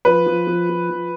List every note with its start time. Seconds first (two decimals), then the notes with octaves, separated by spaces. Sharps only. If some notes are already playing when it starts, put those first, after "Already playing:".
0.05 F3 B4
0.27 F3
0.47 F3
0.69 F3
0.90 F3